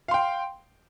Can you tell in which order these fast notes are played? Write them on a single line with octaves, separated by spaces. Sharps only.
F5 C6 G5